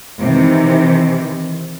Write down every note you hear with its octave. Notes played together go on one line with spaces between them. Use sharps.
C3 D#3 E3